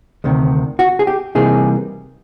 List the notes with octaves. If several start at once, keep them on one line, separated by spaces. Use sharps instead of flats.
D2 C3 D#3
F#4
G#4
G4
C3 E3 G3 A#3 D#4 G#4